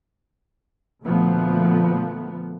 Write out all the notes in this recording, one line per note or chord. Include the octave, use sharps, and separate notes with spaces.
D2 A#2 F3 A3 B3